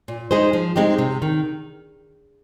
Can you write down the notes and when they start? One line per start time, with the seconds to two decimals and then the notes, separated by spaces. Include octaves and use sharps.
0.08 A#2
0.31 G#3 D#4 G#4 C5
0.53 F3
0.76 G#3 C4 D#4 G4
0.98 C3
1.22 D#3